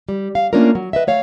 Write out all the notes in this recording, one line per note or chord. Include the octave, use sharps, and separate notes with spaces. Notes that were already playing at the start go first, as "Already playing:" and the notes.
G3
F5
A3 A#3 C#4 D4 F4 A#4
F#3
B4 D#5 E5
A3 C#5 F5